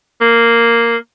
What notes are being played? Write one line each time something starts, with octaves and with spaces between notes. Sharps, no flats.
A#3